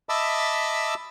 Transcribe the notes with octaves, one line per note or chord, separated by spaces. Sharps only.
D#5 E5 A5 B5 D6 E6